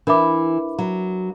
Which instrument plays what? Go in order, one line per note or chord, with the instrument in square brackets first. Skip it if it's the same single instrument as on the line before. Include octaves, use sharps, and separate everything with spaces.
[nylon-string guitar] E3 [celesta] D4 A#4 E5 B5 D6
[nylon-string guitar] F#3